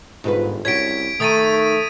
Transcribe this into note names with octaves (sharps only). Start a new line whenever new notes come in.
G1 G#2 F4 B4
C2 C#4 F#4 G#6 B6 D7
D#3 A3 D#6 A6 D#7